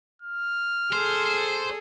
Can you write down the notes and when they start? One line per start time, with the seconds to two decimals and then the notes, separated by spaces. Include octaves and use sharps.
0.22 F6
0.93 G#4 A4 C5